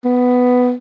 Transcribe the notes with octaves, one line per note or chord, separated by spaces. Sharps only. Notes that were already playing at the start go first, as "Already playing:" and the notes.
B3